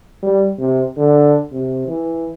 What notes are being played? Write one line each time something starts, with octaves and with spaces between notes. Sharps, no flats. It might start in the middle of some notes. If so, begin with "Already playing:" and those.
G3
C3
D3
C3
E3